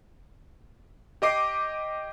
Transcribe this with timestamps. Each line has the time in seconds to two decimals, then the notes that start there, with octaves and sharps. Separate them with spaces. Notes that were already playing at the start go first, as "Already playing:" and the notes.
1.22 G4 D#5 D6 C7